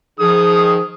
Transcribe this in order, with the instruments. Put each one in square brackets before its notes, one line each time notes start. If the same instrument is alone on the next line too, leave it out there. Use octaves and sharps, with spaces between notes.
[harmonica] D#3 D#6 [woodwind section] F3 G#4